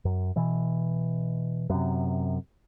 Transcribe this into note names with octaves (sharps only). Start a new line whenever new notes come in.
F#2
B2 E3
F#2 C3